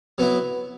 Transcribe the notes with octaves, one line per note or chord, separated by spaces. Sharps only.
F#3 B3 E4